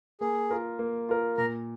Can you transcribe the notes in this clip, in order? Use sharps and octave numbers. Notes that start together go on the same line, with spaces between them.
A#3 G#4
F4 A#4
A#3
F4 A#4
A#2 A#4